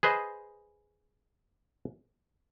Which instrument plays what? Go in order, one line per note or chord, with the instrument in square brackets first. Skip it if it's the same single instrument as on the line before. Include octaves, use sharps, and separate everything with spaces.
[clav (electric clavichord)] G#4 B4 C5 D#5